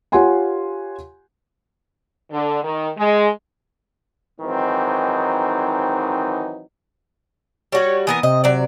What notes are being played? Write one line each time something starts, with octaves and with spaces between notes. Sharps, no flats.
F4 G4 C#5 F#5 G#5 C6
D3
D#3
G#3
G#2 D#3 E3 F#3 C4 D#4
G3 F#4 C#5
E3 B3 A#4 D#6
C3 D#5
F#3 D5